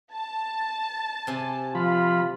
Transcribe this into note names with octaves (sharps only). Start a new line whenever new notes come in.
A5
C3 G#5
F3 F4 B5